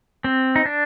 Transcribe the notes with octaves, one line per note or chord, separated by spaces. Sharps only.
C4
D#4
D4